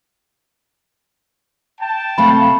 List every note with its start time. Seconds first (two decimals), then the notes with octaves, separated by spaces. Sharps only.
1.79 G5 A5
2.18 C3 A3 F5 B5